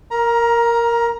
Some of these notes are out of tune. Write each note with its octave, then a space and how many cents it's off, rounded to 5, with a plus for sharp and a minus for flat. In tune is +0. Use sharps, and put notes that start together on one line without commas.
A#4 +0 A#5 +20